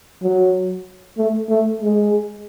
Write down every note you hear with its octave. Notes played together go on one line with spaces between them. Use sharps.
F#3
A3
A3
G#3